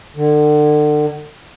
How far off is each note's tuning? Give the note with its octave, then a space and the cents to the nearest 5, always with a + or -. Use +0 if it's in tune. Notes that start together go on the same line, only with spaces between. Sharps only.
D3 +35